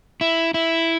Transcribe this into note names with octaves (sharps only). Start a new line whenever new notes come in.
E4
E4